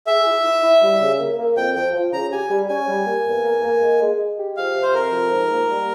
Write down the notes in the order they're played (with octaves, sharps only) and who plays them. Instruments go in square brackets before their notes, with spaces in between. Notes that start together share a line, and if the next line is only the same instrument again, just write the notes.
[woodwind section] G#4 [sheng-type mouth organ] E5
[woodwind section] E4
E4
E4
G3
C#3
A#3
A#3
[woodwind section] F2 [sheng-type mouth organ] G5
[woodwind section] F3 [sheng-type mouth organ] G5
[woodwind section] F3
[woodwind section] C#3 [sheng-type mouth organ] A#5
[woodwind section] G4 [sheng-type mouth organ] G#5
[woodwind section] G3
[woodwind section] C#4 [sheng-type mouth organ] G#5
[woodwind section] G3
A#3
E2
A#3
A#3
G#3
G#3
G#3
G4
[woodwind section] F3 [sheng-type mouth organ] F5
[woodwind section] C3
[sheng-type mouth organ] C5
[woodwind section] F2 [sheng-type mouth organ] A#4
[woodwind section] F3
G#2
A#3
G3